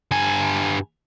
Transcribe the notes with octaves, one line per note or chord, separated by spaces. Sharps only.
G2 G#5